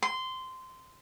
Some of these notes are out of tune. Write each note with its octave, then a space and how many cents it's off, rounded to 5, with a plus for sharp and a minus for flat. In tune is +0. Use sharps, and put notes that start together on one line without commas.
C6 -15